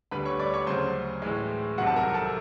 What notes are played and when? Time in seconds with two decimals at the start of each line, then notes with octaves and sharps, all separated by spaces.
0.11 D2 D3 G3 B4 B5
0.25 C#5 C#6
0.39 D5 D6
0.54 C#5 C#6
0.67 D2 C#3 F#3 C5 C6
1.22 A2 E3 G#3
1.78 C2 C3 D#3 F#3 F#4 F#5
1.87 A5
1.96 A#4 A#5
2.14 A4 A5